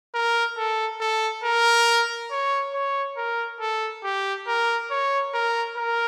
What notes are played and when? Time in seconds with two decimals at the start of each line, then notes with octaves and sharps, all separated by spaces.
0.14 A#4
0.58 A4
1.01 A4
1.44 A#4
2.31 C#5
2.74 C#5
3.17 A#4
3.61 A4
4.04 G4
4.47 A#4
4.91 C#5
5.34 A#4
5.77 A#4